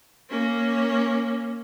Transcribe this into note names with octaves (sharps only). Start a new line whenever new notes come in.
A#3 C#4